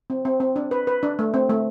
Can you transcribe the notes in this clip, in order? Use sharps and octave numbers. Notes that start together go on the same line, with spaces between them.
C4
C4
C4
D4
B4
B4
D4
A3
C4
A3